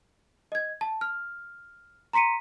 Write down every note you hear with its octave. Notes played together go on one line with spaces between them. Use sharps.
D#5 G#6
A5
F6
A#5 C6 B6 C#7 D#7